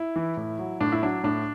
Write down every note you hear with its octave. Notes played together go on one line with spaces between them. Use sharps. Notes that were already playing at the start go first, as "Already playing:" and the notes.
Already playing: E4
E3
A2
F#3
A2 D4
E4
F#3 D4
A2 D4